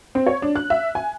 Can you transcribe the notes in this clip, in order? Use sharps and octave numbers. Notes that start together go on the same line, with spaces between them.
C4
C#5
D4
F#6
E5
G#5